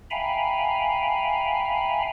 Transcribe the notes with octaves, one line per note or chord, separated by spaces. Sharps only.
E5 F5 G5 G#5 A#5 B5